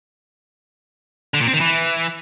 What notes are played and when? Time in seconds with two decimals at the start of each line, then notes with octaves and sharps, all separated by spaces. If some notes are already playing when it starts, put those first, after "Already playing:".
1.34 D3
1.41 A#2
1.47 C4
1.54 D#3
1.60 E3